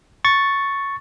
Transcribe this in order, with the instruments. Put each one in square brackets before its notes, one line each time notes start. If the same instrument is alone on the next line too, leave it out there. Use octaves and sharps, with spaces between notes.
[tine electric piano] C#6 A6